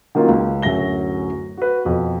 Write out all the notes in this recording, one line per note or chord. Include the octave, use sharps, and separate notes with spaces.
D#3 F#3 A#3 C#4 F4
C#2
D1 F#2 F#3 E5 A#6 G7
F#4 B4
F2 B2